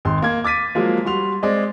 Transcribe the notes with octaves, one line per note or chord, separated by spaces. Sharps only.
G#1 C6
A#3 G#6
D6 A6 B6 D#7
F3 F#3 G#3 A#3
G3 F#4 C6 F7
G#3 C4 D5 D#5